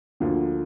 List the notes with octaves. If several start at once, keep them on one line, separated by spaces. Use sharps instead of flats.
D2 D3 F3 A#3